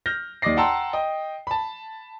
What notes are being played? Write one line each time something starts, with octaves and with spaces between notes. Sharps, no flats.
F6 G6 A#6
D#2 D5 D#5 D6 A#6 C7
F#5 G5 A5 A#5 C6 E6
D#5 G5
A5 B5